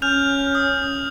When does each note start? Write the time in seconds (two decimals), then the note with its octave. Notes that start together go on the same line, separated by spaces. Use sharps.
0.02 C#4 F6 G6 F7
0.55 D#6